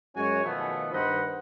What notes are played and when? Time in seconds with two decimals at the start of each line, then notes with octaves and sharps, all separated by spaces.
0.15 F#2 G#3 C#4 F#4 C#5 G#5
0.44 B2 D#3 F3 A3 B3
0.92 G2 D#3 C5 D#5 F#5 B5